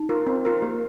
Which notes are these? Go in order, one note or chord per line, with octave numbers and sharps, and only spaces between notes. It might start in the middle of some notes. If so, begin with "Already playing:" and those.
Already playing: D#4
F4 A#4
C4
F4 A#4
A#3 G4